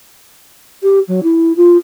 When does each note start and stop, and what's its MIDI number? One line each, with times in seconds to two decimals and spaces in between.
0.83 0.99 67
1.08 1.20 54
1.23 1.52 64
1.56 1.77 65